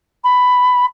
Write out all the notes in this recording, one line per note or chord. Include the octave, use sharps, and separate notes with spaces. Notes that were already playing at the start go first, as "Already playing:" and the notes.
B5